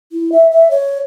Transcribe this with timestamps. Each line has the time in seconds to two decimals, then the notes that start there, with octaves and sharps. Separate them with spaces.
0.12 E4
0.32 E5
0.51 E5
0.71 C#5